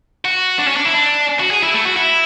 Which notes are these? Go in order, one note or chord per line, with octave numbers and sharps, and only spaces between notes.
F#4
D4
C#4
D4
E4
D4
F#4
G#4
E4
A3
F#4
E4